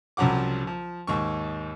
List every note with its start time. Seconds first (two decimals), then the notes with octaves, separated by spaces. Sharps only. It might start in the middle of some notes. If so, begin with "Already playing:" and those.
0.17 C2 C#3 F3 F#3 F#5 D6
0.67 F3
1.07 D#2 G#2 C#6